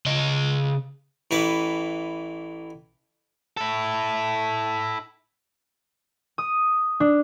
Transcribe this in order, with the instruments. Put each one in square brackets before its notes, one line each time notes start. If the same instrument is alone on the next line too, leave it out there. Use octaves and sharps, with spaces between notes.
[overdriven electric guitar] C#3 D#5
[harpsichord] A1 E3 B4
[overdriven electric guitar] E4 A4
[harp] D#6
D4